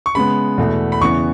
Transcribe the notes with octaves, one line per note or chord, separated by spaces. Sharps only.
C#6
C#3 G#3 B3 B5
E2 B2 A3
B5
E2 C#3 E3 B3 C#6